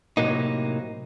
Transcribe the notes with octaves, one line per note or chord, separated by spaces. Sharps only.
A2 C3 E3 F#3 A#3 D#4